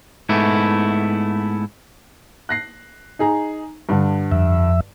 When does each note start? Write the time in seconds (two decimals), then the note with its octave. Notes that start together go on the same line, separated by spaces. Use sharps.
0.29 G#2 A3 B3 E4
2.49 F#6 A#6 C7
3.19 D#4 G#4 A#5
3.89 G2 D3
4.31 F2 E5